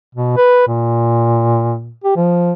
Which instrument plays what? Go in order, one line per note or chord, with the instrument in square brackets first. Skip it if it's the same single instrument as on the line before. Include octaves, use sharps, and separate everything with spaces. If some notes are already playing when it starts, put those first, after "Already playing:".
[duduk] B2
B4
A#2
G4
F3